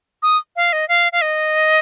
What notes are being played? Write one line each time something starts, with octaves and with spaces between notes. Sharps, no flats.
D#6
F5
D#5
F5
F5
D#5